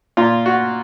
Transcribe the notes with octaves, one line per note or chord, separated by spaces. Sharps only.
A#2 F4
F#4